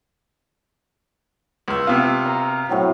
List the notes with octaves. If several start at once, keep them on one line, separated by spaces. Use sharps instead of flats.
C#2 E6
C3 B3 F4
A#5
A2 C3 F#3